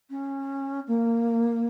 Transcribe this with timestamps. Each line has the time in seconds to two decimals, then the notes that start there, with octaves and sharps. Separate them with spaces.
0.10 C#4
0.87 A#3